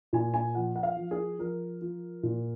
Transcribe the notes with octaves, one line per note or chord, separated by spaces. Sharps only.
A#2 G#5
G#5
F3 F#5
F#5
F5
F3
G#4
F3 A#4
F3
A#2